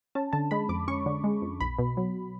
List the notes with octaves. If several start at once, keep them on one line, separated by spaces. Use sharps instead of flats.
C#4 A5
D3 A5
G#3 B5
F2 D6
C#4 C#6
D3
G#3
F2
B1 B5
B2
F#3